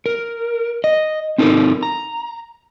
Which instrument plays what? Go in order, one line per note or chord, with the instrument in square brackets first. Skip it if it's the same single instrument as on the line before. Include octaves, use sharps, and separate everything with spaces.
[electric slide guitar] A#4
D#5
C4 D#4 A4 A#4
A#5